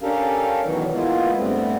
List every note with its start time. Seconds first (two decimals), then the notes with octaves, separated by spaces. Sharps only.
0.01 C#4 D4 G4 A4 A#4 F5
0.63 B2 D#3 E3 F#3
0.94 G#3 A#3 B3 E4 F4
1.37 G2 G3 A3 B3 C4